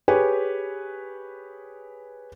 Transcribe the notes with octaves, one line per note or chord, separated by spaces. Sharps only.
G4 G#4 B4 C#5 G#5